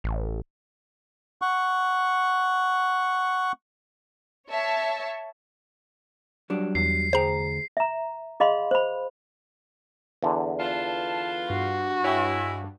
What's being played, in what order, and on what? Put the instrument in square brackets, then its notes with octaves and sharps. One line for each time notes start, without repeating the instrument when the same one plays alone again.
[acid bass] A1
[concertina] F#5 C#6
[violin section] C#5 E5 A5
[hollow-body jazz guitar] F#3 G3 D4
[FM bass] E2 [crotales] C7
[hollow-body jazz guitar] D2 G#4 G5 [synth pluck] C5 A#5
[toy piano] E5 A#5
G#4 D#5 F5 B5 C6
C5 B5
[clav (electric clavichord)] E2 D3
[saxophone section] B3 F4 [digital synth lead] A5
[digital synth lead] G2 [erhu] F#4
[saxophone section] G#3 E4 [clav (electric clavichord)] C#5 E5 G5